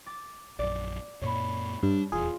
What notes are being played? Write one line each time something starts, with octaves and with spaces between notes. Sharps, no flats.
D6 A6
A#1 F#2 D5
F#2 A#2 A#3 C#5 B5
G2 D4
D#1 E2 F4 G#4